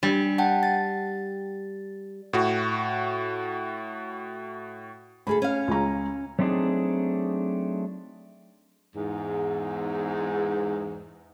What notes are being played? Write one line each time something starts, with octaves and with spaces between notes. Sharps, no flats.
G3 D4
F#5 G5 A5
A6
A2 F#4
D2 G#4 A4 B5
C#4 F5
C#2 A#5
F#3 A3 C4 D4 D#4 G#4
E2 G#2